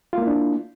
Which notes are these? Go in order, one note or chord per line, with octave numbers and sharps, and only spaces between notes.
A#3 D4 E4 F4